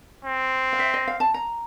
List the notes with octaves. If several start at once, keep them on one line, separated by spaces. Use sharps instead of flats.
C4
F5
E5
D#5
F5
A5
A#5